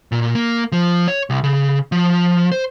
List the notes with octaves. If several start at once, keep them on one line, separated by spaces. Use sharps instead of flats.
A#2
A#3
F3
C#5
C2
C#3
F3
C5